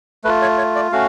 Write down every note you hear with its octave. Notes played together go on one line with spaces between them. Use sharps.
A3 F4 B4
C#5
C#5
D5
A3 C#4 F#4 F5